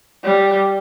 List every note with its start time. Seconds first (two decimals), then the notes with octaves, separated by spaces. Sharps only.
0.24 G3